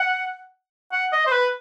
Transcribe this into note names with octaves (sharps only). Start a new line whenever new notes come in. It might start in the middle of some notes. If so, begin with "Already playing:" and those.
Already playing: F#5
F#5
D#5
C5
B4